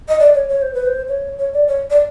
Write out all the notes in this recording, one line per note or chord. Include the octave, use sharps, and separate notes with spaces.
D#5
D5
C#5
C#5
C5
B4
C5
C#5
C#5
D5
C#5
D5